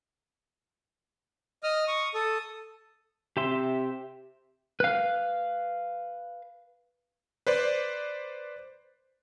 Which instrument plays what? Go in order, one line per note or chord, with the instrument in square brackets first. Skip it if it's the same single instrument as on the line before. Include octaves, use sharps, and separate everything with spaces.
[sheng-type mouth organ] D#5 D#6 F6
C#6 D#6
A4 D#6
[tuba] C3 [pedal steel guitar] G4 E5 C6
[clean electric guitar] B4 F5
[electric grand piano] B4 C5 D5